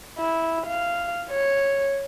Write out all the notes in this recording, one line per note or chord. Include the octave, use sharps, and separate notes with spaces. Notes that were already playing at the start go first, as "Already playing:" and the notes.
E4
F5
C#5